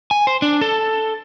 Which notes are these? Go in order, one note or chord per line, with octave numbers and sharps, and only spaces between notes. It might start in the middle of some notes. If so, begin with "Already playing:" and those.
G#5
C5
D4
A4